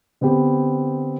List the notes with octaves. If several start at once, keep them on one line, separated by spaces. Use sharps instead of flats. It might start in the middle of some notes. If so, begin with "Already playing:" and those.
D3 B3 C4 G4